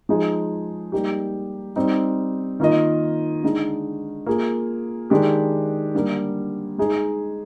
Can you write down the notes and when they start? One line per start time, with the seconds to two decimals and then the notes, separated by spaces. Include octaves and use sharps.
0.09 F3 G#3 D#4 G#4
0.92 G3 A#3 D#4 G4
1.76 G3 C4 D#4
2.60 D#3 A#3 F4 A#4 D#5
3.43 D3 G#3 D#4
4.26 A#3 F4 G#4
5.10 D#3 G#3 D4 G4
5.95 D3 G3 A#3
6.78 G#3 D#4 G#4 D#5